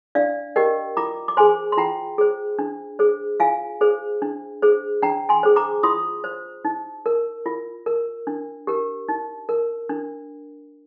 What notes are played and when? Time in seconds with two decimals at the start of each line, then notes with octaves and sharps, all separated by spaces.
0.15 D4 D5 F5
0.56 G4 A#4 D#5 G5
0.97 F4 A#5 D6
1.28 D6
1.37 G#4 C5 G#5 C6
1.72 C6
1.77 F4 G5 A#5
2.18 G#4 C5
2.59 D4
2.99 G#4 C5
3.40 F4 F5 G#5
3.81 G#4 C5
4.22 D4
4.62 G#4 C5
5.02 D4 G5 A#5
5.29 G#5 C6
5.43 G#4 C5
5.56 A#5 D6
5.83 F4 C6 D#6
6.24 C5
6.65 D#4
7.06 A#4
7.46 F4
7.86 A#4
8.27 D4
8.67 G4 A#4
9.08 D#4
9.49 A#4
9.89 D4